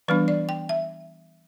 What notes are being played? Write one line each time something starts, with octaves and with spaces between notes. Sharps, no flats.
E3 G3 B3 D4 B4
D5
G5
E5